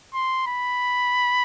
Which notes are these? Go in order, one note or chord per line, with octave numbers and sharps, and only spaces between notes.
C6
B5